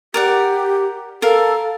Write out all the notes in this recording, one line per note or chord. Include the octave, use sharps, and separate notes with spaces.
G4 A#4 D5 F#5
A4 A#4 F5